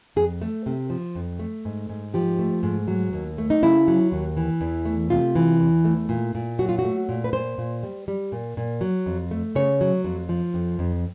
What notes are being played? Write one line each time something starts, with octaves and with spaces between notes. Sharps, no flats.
F2 G#4
A3
C3
F3
F2
A3
G#2
G#2
F3 G4
A3
G#2
F#3
D#2
A3
D#4
C#3 E4
F#3
D#2
E3
E2
A3
C3 F4
E3
E2
A3
A#2
A#2
F#3 F#4
F4
F#4
A3
A#2
B4
A#2 C5
A#2
G3
G3
A#2
A#2
F#3
F2
A3
C#3 C#5
F#3
F2
F3
F2
F2